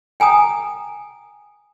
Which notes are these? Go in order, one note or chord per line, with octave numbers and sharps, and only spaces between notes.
G5 G#5 A#5 D#6